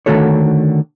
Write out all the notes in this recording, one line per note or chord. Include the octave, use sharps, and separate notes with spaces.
D3 D#3 A3 F#4 A4 C#5